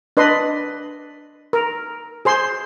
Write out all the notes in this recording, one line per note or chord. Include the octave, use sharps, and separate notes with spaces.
D4 B4 D#5 C6
A#4
G#4 C5 C6